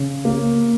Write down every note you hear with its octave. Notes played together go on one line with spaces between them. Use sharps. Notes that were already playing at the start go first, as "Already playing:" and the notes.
Already playing: C#3
A#3